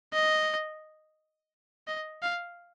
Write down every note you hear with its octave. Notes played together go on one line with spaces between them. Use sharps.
D#5
D#5
F5